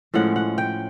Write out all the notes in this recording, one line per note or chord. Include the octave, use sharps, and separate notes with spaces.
A2 F3 G#3 C#4 F#5
F#5
G5